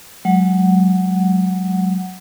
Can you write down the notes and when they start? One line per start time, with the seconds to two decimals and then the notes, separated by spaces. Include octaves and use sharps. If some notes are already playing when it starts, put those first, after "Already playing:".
0.25 F#3 G#3 F#5